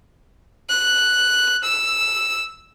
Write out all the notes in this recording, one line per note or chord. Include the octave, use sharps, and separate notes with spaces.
F#6
E6